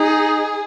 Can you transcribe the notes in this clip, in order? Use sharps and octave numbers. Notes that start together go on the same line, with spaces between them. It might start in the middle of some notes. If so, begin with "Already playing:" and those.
Already playing: D#4 G#4